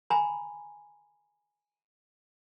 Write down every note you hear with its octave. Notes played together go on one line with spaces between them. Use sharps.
G#5 A#5 B5